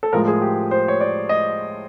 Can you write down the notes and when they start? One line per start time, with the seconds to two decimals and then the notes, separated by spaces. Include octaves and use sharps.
0.03 A4
0.13 A2 F3 G#3 A#4
0.27 G#4
0.42 G4
0.71 C5
0.88 C#5
1.01 D5
1.29 D#5